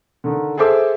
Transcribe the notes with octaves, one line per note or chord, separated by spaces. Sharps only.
D3 D#3
G#4 A4 C5 E5 D6 E6